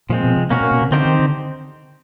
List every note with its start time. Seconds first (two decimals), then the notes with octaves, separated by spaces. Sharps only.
0.09 A#2 F3 G#3 C4
0.24 B2
0.37 C3
0.50 B2 A#3 C#4 F#4 A#4
0.61 A#2
0.71 B2
0.82 C3
0.91 D3 C4 D#4 G4 C5
1.05 D#3
1.19 D3